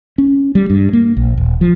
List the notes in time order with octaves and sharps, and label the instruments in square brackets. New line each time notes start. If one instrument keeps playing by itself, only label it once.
[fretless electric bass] C#4
G3
G2
A#3
A#1
D#1
F3